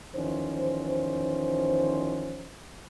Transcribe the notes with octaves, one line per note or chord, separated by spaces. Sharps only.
E2 D#3 F3 C#4 C5